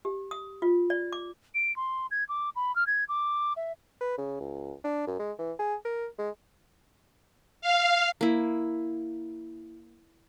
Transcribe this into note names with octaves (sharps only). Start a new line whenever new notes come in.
G4
D#6
F4
D5
D6
D7
C6
G#6
D6
B5
F6
G#6
D6
E5
B4
C#3
C#2
D4
F#2
G#3
E3
G#4
A#4
G#3
F5
A#3 E4